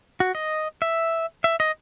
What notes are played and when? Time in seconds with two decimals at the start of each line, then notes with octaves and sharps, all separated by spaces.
0.20 F#4
0.35 D#5
0.82 E5
1.44 E5
1.60 D#5